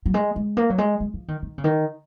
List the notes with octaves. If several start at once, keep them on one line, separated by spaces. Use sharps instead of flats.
F#3
G#3
G#3
A#3
F#3
G#3
G#3
F3
D#3
D#3
C#3
D#3